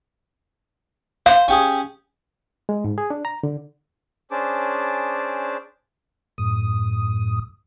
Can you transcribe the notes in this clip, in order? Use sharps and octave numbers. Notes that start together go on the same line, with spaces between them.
C5 F5
C#4 G4 G#4
G#3
G#2
G#4
D4
A#5
D3
C#4 D4 G#4 C5 A5 D6
F#2 A2 D#6